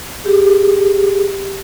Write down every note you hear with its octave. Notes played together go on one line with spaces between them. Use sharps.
G4 G#4